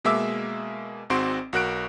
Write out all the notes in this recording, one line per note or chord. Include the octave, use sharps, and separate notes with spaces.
B2 G#3 A#3 E5 D6 E6
G#1 G#2 C4 F#4 C6 D7
B1 F#4 A#4 F#6 D7